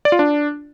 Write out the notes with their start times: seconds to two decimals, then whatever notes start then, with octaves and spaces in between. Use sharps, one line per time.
0.05 D5
0.12 F4
0.19 D4